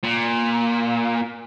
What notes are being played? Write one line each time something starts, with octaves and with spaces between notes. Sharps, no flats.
A#2